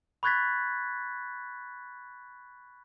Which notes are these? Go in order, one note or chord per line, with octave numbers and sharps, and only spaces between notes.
B5 C#6 F#6 G#6 A6 B6